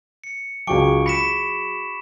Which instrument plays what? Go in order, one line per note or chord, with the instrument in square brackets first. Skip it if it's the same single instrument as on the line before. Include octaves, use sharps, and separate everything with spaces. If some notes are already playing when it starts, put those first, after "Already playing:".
[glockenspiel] C#7
[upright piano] C#2 G5 [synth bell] F#3 F#4 G#4 [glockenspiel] C#6 D6 D7
[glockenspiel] B5 B6 E7 [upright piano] C#7